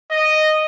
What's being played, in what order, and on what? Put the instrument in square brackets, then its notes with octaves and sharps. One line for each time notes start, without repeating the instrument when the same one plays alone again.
[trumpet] D#5